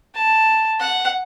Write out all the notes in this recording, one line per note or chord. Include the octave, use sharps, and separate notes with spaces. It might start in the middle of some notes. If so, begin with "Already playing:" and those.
A5
F#5